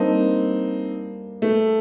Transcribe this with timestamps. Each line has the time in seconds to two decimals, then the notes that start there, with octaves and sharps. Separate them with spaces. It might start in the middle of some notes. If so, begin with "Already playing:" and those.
Already playing: G3 A#3 C4 D4 D#4
1.42 A3